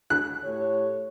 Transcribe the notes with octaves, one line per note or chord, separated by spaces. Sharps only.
F#6
A2 G4 C#5